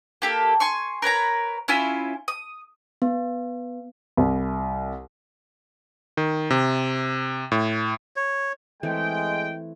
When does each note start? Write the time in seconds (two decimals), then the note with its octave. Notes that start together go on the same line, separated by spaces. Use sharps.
0.22 A#3 G4 A4
0.60 G#5 C6 C#6
1.02 A#4 B4 C#5 A#5
1.68 C#4 E4 F4 G#5
2.28 D#6
3.02 B3
4.17 C2
6.17 D#3
6.50 C3
7.52 A2
8.16 C#5
8.83 E3 G#3 A3 C4 G5